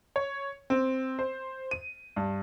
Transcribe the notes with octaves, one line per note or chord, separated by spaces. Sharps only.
C#5
C4
C5
D#7
G2